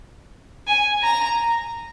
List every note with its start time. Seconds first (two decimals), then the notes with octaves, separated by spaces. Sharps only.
0.67 G#5
1.03 A#5